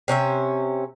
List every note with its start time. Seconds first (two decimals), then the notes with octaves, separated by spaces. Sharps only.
0.08 C3 C#4 G4 E5